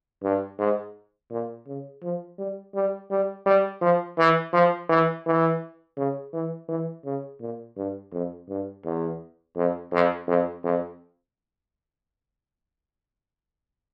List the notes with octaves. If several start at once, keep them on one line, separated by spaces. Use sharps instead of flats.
G2
G#2
A#2
C#3
F3
G3
G3
G3
G3
F3
E3
F3
E3
E3
C#3
E3
E3
C#3
A#2
G2
F2
G2
E2
F2
F2
F2
F2